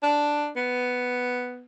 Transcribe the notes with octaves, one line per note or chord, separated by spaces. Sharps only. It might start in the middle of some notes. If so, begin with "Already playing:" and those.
D4
B3